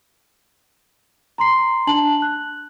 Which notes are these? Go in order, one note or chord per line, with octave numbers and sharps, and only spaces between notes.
A#5 C6 C7
D4 A5 F#7
F#6